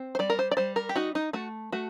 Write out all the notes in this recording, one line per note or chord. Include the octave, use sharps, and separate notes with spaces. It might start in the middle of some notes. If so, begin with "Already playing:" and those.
Already playing: C4
C5
G3 D5
A#4
C5
D5
G3 C5
A#4
G4
D#4 F#4
D#4
A3 F#4
A3 F#4